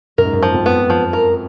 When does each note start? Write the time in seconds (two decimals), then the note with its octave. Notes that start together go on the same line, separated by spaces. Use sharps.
0.18 F#2 A#4
0.25 G#2
0.33 F#2
0.43 F3
0.54 F2
0.66 B3
0.90 F3
1.13 A#4